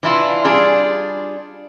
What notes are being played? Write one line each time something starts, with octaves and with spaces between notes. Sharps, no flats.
E3 D4 E4 F4
G3 D4 F4 G#4